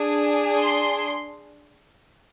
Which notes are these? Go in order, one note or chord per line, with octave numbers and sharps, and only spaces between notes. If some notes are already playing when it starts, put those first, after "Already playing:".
Already playing: D4 G#4
C6